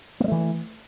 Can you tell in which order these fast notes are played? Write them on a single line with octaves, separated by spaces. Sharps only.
A#3 G3 A3 E3